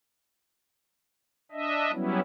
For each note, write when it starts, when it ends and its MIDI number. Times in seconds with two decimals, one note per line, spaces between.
1.52 1.91 62
1.52 1.91 75
1.52 1.91 76
1.92 2.20 54
1.92 2.20 55
1.92 2.20 59
1.92 2.20 61
1.92 2.20 64